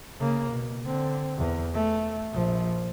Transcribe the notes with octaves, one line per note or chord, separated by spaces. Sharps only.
C#3 A#3
B2
D3 C4
E2
A3
A#1 F3